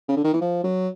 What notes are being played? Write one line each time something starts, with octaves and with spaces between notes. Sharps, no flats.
C#3
D3
D#3
E3
F3
F#3